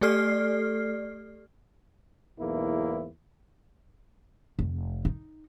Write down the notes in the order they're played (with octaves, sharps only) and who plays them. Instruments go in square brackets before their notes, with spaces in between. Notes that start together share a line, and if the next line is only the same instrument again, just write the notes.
[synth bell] A3 G4 A4 D5 F6 C7
[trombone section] B1 E2 G#2 A#3 E4
[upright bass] F1
D#4